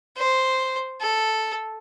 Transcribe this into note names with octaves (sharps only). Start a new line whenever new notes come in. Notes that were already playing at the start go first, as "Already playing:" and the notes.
C5
A4